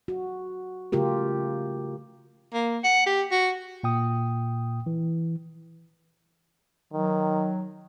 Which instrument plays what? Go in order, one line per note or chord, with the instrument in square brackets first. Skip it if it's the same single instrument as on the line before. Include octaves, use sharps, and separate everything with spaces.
[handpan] F#4
C#3 A3 F4 G4 A#4
[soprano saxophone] A#3
F#5
G4
F#4
[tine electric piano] A#2 G5 D#6
E3
[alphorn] D#3 [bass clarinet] F#3